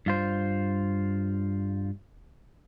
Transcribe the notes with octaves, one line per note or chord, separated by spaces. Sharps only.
G2 F4 C5